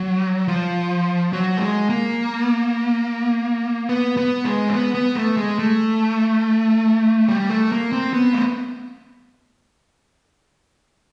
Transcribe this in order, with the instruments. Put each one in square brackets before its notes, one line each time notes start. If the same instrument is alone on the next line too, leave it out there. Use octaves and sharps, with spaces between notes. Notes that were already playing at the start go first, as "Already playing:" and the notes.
Already playing: [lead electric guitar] F#3
F3
F#3
A3
G#3
A#3
B3
B3
G#3
C4
B3
B3
A3
G#3
A3
G3
A3
A#3
C4
B3
A3